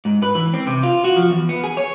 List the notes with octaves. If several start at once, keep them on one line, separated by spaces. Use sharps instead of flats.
G#2
B4
E3
C4
C3
F4
F#4
F3
E2
B3
G#4
C#5